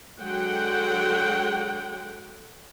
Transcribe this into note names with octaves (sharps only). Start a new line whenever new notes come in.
D3 F#3 G#3 F#5 G5